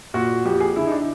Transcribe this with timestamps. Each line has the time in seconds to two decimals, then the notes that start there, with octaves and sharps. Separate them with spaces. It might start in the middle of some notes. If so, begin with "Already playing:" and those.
0.14 A#2 F#4
0.45 F2 G4
0.60 G#4
0.76 D3 E4
0.87 D#4
0.92 D4